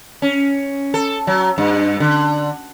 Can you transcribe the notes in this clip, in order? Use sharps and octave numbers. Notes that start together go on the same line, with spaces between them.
C#4
A4
F#3
G2
D3